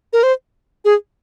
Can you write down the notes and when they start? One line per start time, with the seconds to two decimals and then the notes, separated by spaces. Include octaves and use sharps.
0.13 A#4
0.23 C5
0.85 G#4